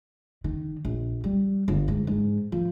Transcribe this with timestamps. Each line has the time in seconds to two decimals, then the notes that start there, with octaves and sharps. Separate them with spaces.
0.44 D#3
0.85 A#1
1.24 G3
1.68 G1
1.88 G#2
2.07 G#2
2.52 F3